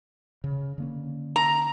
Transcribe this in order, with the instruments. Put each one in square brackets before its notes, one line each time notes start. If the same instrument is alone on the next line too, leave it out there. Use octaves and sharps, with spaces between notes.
[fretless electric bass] C#3
D3 A#3 C#4
[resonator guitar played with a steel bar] A#5